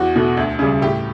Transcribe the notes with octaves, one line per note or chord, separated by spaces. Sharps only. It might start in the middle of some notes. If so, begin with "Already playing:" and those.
Already playing: E2 F#4
B2 A3
D2
C#3 G3
A2 G4